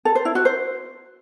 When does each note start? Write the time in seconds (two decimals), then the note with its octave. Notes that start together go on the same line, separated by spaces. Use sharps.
0.05 A4
0.15 C5
0.25 E4
0.35 F#4
0.45 C5